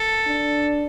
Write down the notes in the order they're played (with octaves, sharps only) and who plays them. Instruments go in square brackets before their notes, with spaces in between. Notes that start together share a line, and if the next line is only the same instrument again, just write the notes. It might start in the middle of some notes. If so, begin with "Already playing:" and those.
Already playing: [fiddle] A4
[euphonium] D4